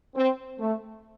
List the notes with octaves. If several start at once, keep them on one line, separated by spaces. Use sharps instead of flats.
C4
A3